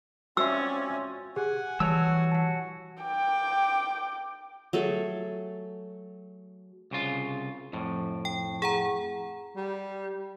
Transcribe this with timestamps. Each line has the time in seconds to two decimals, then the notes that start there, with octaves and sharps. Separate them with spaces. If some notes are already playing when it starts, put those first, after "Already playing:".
0.37 C4 C#4 F4 F#4 D5 E5 E6
1.36 G4 G#4 F#5 G#5
1.80 E3 G3 F#4 C#5 A5 E6
2.32 F#5 A5
3.02 G5 D6
4.73 F#3 A3 G#4 A4
6.91 C2 C#3 F4
7.73 F2 A2
8.25 G5
8.62 G#4 F#5 A#5
9.57 G3